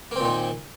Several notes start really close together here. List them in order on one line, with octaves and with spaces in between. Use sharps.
A#3 C4 A#2 D#3